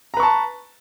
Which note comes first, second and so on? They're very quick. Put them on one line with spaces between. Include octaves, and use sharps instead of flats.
A#5 B4 C#6 A5